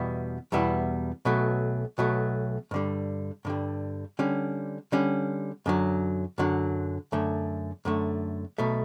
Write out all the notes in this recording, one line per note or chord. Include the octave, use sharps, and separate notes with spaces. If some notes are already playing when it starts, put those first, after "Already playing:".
Already playing: E2 B2 G3 B3 E4
E2 B2 G3 B3 E4
B1 B2 F#3 A3
B1 B2 F#3 A3
G2 D3 G3
G2 D3 G3
D3 G3 C#4
D3 G3 C#4
F#2 D3 F#3
F#2 D3 F#3
F#2 D3 A3
F#2 D3 A3
B1 B2 A3